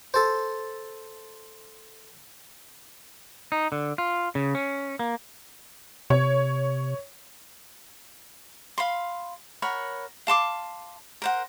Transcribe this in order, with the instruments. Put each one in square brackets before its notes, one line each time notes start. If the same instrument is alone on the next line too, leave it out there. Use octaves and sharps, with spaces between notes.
[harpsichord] A4 C5
[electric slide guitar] D#4
D3
F4
C#3
C#4
A#3
[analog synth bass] C3 [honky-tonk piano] C#5
[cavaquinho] F5 B5 C6
A#4 C#5 F#5 B5
F5 A5 C6 D6
A#4 C5 F#5